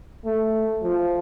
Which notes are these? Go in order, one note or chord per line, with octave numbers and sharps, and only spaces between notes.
A3
F3